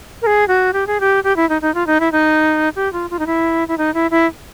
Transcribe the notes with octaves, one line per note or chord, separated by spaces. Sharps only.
A#4
G#4
F#4
G4
G#4
G4
G4
E4
D#4
D#4
F4
D#4
E4
D#4
G4
F4
F4
D#4
E4
E4
D#4
E4
E4